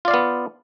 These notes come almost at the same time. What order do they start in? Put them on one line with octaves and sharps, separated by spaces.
F4 D5 F5 B3